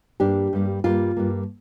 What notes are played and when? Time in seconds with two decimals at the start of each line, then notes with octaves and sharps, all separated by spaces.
0.20 G2 G3 A#3 D4 G4
0.53 G2 G3 A#3
0.84 G2 G3 A#3 F4
1.17 G2 G3 A#3